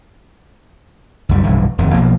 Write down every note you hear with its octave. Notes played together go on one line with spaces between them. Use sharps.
C#2 F#2 G3
F1 B1 G2 E3
D1 F2 D#3
B1 B2 F3 A#3